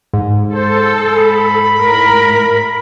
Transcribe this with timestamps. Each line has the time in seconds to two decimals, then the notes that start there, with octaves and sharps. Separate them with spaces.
0.13 G#2
0.54 A4 C5
1.11 B5
1.79 A2 A#4